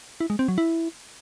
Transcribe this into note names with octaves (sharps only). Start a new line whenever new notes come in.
E4
G#3
C4
F#3
E4